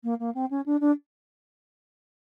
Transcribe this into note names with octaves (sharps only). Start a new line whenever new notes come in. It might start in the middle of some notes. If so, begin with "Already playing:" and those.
A#3
A#3
C4
C#4
D4
D4